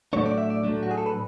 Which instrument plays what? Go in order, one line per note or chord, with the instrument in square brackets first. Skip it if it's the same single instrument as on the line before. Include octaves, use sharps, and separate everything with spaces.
[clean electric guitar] A2 F#3 A3 D4 C#5
D5
E5
D5
A2 F#3 A3 D4
F#4
G#4
A4
B4